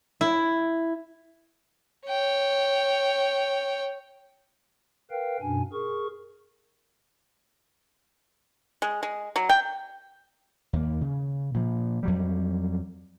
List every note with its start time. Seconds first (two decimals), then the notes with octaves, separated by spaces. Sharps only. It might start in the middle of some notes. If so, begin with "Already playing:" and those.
0.21 E4
2.07 C#5 G5
5.11 A#4 B4 F5 G5
5.42 F#2 B2 D4 G#5
5.73 G#4 A#4 C#6
8.82 G#3
9.03 G#3
9.36 F#3
9.49 G5
10.73 D#2 A#3
11.01 C#3
11.54 A#2 F3
12.03 F2 F#3 G3